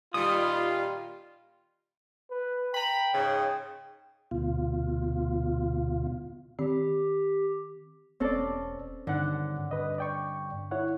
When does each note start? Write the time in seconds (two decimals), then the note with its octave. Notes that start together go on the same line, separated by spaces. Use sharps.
0.14 A#2 D#3 G3 F4 D#6
2.31 B4
2.74 G5 A#5 B5
3.13 G#2 C#3
4.31 D2 B2 F4
6.59 D#3 C4 G4
8.20 E1 C4 C#4 A4 C#5 D5
9.07 G2 D3 D#3 F#5
9.71 G2 B4 D#5
9.98 D5 G5 C#6
10.71 E4 C#5 F#5